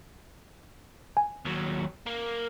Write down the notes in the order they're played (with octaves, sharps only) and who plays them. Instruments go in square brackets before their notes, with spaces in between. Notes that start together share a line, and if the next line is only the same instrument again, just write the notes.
[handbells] G#5
[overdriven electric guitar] D#2 F#3
A#3